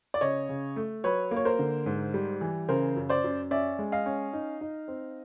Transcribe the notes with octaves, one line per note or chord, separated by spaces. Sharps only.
D5
C#3 C#5 D#5
C#3
A3
F#3 B4 C#5
A#3
C#5
A#4 C5
D3
G#2
G3
E3
C#3 A#4 C5
F#2
C5 D5
F#2
C#4 D5 E5
G#3
D#5 F5
C#4
D#4
D#4
C4